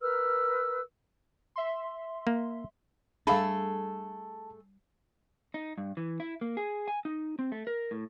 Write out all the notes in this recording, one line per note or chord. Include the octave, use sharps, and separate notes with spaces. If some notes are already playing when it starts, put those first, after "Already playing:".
A#4 B4 E6 F6
E5 C6
A#3
G3 A3 D4 G#4 A4 F5 A5 B5
D#4
G2
E3
E4
A#3
G#4
G#5
D#4
C4
A3
A#4
A2